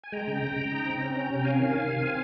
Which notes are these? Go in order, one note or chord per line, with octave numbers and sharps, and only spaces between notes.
G#5
G#3 G5 A#5
C#3
C#3
C#3
D#4
C4
C#4
C#4
C3
C#4 F5 G#5
D#3
D#3
C3
C4